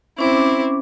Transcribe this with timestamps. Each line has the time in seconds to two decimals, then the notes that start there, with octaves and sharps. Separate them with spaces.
0.19 C4 C#4 E4 D6